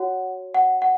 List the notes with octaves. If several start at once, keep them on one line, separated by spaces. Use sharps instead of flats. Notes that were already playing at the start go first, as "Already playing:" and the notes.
Already playing: F#4 C#5 F#5
F#5
F#5